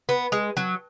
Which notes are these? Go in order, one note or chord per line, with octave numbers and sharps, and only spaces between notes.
B3
G#3
F#3